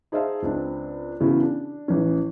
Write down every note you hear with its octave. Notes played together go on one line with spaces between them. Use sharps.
D#4 G#4 C5 E5 F5 A5
C#2 C4 D4
C#3 E3 B3 E4 F#4
D4
A1 C#4